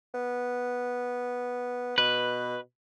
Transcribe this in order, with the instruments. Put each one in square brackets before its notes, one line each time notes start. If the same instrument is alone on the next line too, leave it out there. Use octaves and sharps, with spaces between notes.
[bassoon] B3
[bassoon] B2 [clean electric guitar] B4